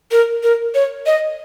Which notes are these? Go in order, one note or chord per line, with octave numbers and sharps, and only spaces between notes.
A#4
A#4
C#5
D#5